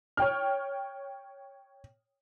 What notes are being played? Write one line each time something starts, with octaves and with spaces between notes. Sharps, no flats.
C#5 G5 F6